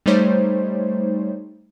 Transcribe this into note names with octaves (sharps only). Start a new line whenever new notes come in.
G3 A3 D#4 C5 C#5